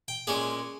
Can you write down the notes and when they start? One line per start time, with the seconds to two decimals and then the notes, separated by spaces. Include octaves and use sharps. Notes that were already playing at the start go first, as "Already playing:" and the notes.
0.08 G5
0.27 A#2 G#3 C#4 G#4